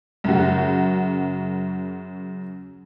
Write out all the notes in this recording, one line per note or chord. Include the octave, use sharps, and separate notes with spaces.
F#2 C#3 F#4